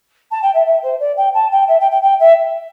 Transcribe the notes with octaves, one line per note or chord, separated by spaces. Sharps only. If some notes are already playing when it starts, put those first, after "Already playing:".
A5
G5
E5
E5
C5
D5
G5
A5
G5
E5
G5
G5
G5
E5